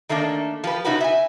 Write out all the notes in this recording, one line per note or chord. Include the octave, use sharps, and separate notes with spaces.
D#3 A3 A#3 D4
F3 G4 B4
C3 C#4 D#4 E4 F#4 B4
E5 G#5